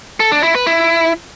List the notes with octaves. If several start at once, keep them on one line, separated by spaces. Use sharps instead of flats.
A4
D4
E4
B4
E4